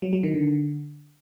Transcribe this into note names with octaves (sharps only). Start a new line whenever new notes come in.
F#3
F#3
D#3
D3